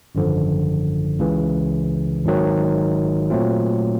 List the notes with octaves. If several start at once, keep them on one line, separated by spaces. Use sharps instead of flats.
G#1 F#2 D3 F3
C#2 C#3 E3
G#1 G#2 D#3 F#3
A#2 F#3 A3 C4 F4